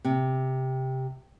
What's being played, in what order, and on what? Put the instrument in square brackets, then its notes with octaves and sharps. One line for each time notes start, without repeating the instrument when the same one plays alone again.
[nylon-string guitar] C3